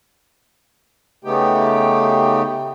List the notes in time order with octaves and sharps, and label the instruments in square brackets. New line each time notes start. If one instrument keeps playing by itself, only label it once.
[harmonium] C#3 A3 B3 D#4 G4 G5